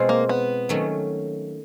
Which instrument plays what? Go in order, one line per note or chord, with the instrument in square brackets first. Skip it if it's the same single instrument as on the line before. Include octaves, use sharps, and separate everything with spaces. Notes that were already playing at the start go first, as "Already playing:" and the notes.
Already playing: [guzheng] B2 G#3 C4 F4
[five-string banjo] A#3
B3
[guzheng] D#3 F#3 A3 C#4